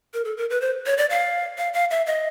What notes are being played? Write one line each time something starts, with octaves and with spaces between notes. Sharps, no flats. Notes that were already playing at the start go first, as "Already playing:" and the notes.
A#4
A4
A#4
B4
C5
C#5
D5
F5
F5
F5
E5
D#5